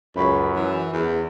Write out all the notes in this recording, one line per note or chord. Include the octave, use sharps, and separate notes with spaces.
C#2 F#2 B5 C#6 B6
E3
E2